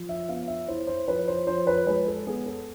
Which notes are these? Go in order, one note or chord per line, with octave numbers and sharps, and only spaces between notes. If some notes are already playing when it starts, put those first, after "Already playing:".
Already playing: F3
E5
B3 F5
E5
E4 C5
C5
F3 B4
C5
F3 C5
B4
G#3 B4
A4
B3 G#4
A4